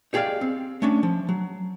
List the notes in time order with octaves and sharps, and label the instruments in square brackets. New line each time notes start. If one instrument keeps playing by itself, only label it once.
[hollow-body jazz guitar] D#4 G4 G#4 C#5 D5 F5
C4
A3 C#4 D4
F3
F#3